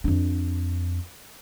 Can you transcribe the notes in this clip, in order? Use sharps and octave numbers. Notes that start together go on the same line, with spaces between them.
F2 D4